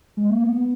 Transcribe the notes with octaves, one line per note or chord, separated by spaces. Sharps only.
G#3
A#3
B3